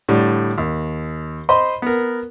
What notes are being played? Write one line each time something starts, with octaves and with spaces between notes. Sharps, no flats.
A2 D3 G3
D#2
C5 D#5 B5 C6
B3 A#4